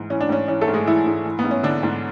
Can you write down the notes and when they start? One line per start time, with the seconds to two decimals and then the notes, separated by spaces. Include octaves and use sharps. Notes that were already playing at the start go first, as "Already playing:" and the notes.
Already playing: G#2 E3
0.10 E3 C#4
0.21 D4
0.29 G#2 C#4
0.48 E3 C#4
0.61 A3 A4
0.68 G#2
0.74 G#3 G#4
0.86 E3 E4
1.06 G#2
1.25 E3
1.39 B3
1.44 G#2
1.51 C#4
1.63 D3 E3 D4
1.83 G#2